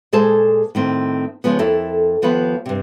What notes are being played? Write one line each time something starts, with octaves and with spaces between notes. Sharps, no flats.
A#2 G#3 G#4 A4 C5 A5
A2 D#3 C4
C#3 E3 F3 G#3 B3
F2 E4 A4 A#4
D#2 F3 B3 F4 B4
G2 C3